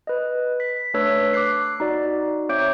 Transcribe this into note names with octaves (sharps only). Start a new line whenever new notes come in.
B4 D#5
B6
A3 D4 B4 C#5 E6 B6
D6 F#6 C7
D#4 F#4 D5
C4 C#5 E5 D6 G6 D7